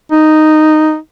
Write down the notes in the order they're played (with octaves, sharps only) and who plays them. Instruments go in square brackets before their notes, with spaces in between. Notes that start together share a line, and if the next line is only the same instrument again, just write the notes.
[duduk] D#4